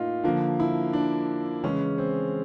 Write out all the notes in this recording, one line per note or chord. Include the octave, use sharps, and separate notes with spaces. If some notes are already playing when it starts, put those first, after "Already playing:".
Already playing: A2 A#3 D#4 F4
D3 F3 A#3
E4
D4
C#3 E3 G#3 C#4
C4